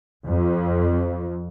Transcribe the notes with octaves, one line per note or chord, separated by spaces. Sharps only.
F2